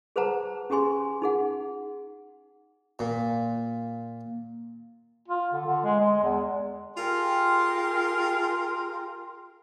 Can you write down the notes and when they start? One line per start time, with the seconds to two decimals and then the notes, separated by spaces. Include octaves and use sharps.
0.16 G#4 B4 C5 F#5 A5 A#5
0.70 C#4 G4 G#4 G#5 C6
1.22 D#4 G#4 F#5
2.99 A#2
5.28 F4
5.53 D3
5.66 D3
5.84 G#3
6.00 G#3
6.23 E2
6.97 F4 G4 G#4 A#4 G5 C6